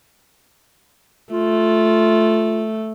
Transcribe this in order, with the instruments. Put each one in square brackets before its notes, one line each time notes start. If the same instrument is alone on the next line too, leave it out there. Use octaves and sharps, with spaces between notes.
[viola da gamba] A3 [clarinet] F4